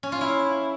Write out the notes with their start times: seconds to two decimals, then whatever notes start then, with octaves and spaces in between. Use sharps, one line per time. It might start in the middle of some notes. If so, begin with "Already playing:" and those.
0.03 C#4
0.12 F4
0.21 E4